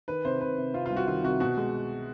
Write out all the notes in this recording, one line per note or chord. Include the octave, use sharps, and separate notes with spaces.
D#3 B4
C3 C5
C3 B4
C3
C3 F4
C2 F4
F#4
D#3 F4
C3 F#4
B2 F#4
G#3